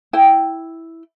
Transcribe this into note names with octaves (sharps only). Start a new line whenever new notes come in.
E4 G5